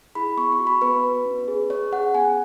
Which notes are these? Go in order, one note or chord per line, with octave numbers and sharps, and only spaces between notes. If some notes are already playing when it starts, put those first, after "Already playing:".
E4 G#4 B5
B3 C#6
C#6
F#4
B5
B3 B4
F#4
C#4
G#4
C#4 C#5
G#4 F#5
B3 G#5